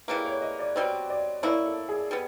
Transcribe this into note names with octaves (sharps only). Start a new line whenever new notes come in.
C#3 E3 G3 A#3 B4
C#5
D#5
D5
B2 G3 C4 D#5
D5
A#3 C#4 E4 D5
A4
G#4
G3 B3